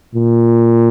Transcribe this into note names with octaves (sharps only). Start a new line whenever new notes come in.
A#2